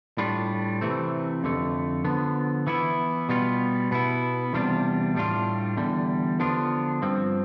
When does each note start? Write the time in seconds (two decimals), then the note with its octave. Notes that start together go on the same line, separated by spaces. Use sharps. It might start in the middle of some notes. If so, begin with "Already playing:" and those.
0.18 A2 G3 D4 F4
0.81 C3 E3 A3 C4
1.43 F2 D3 A3
2.04 D3 F3 B3
2.67 E3 B3 E4
3.29 B2 G3 B3 F4
3.91 B2 B3 E4
4.53 E2 C3 G3 D4 F4
5.15 A2 G3 D4 F4
5.77 E2 D3 G3
6.39 D3 F3 B3 D4 F4
7.02 G2 F3 C4